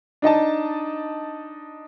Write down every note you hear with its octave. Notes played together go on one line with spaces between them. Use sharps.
D4 D#4 D#5 A5